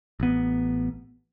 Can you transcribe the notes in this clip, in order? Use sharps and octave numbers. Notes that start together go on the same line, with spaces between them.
A1 B3